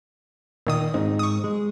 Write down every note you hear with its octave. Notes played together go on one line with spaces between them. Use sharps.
A#2 D#3 D#6
G#2 C4 D#4
C#6 D#6
G#3